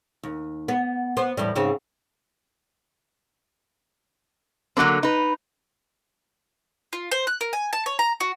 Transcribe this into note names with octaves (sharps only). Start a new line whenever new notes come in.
D#2
B3
B3 C5
E2 A2 G3
G#2 C#3 C4
D3 F#3 A#3 C4
D#4 B4
F4
C5
F#6
A#4
G#5
A5
C#5
A#5
F#4